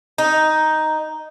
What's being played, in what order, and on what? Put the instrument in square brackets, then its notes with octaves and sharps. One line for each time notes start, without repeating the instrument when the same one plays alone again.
[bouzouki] D#4